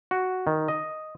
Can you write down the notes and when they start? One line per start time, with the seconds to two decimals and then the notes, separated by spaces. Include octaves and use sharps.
0.11 F#4
0.47 D#3
0.68 D#5